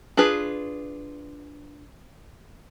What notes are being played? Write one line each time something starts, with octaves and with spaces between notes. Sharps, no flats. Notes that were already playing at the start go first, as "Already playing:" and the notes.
D4 F4 G#4 B4